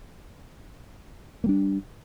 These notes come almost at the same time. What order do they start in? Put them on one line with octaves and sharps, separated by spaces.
A#3 G3 D4